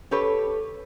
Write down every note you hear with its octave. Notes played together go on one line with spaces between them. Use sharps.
G4 A4 B4 C#5